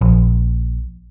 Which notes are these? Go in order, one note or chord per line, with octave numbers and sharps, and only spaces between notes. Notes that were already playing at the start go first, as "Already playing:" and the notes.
A#1